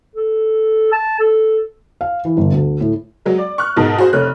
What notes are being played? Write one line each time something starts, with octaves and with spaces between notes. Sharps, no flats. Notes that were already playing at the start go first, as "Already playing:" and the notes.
A4
A5
A4
F5
E3
G1
D2
A2
F#3 G#3
D5
C#6 F6 F#6
G#2 B2 D#4 A#4 A5
F#4 G#4 C5
F1 A3 C#5 F6 F#6